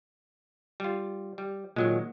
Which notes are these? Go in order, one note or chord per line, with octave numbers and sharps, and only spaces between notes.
G3 F4
G3
A#2 D#3 F#3 G#3